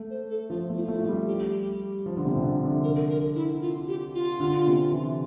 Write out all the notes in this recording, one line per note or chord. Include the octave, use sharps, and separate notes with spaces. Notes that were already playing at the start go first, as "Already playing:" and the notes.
Already playing: A3
C5
A4
F3 F4
A3
E4
F4
A3
E4
A3 F4
G3
G4
F3
D3
C3
C3
D3
D3
A#4
A#4
E4
F4
G4
F4
D3
C3
E3